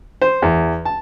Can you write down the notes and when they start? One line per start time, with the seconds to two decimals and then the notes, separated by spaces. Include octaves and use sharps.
0.22 C5
0.42 E2
0.85 A5